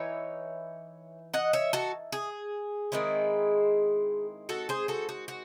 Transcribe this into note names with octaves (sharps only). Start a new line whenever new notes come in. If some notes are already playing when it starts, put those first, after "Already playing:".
Already playing: E3 D#4 C#5 E5
D#5 F#5
C#5 E5
F#4 A4
G#4
D#3 G#3 C4 E4
F#4 A4
G#4 C5
F#4 A4
F#4
F#4